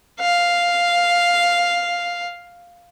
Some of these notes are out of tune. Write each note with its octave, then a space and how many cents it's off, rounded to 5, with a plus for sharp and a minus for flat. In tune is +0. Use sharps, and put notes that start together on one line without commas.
F5 +0